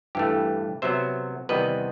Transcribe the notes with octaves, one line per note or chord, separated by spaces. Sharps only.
G2 E3 A3 G4
C3 F#3 B3 C5 E5
E2 C3 D#3 G3 B3 B4 D#5